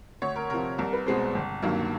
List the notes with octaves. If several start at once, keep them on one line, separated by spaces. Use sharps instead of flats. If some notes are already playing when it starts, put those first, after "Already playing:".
D2 C#5
A#4
C3 F3 A#4
C2 A#4
B4
B2 G#3 C4 C5
G1
G2 D#3 F#3 A#3